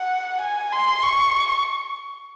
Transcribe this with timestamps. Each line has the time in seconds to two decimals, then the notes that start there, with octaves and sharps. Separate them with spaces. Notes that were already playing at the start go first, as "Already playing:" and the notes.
Already playing: F#5
0.42 G#5
0.73 C6
1.03 C#6